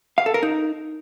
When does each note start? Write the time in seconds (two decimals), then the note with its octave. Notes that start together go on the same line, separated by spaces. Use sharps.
0.18 F5
0.26 A4
0.34 A#4
0.43 D#4